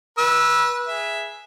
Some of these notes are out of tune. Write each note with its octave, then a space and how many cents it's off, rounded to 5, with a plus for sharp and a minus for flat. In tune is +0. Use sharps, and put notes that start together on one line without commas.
B4 -25 E6 +0
G#4 +0 E5 +5